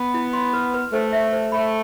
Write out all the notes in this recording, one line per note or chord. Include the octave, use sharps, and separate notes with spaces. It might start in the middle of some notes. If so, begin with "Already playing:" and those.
Already playing: B3
E4
C6
B4
B4
A3 C5
E5
C5
A3 B5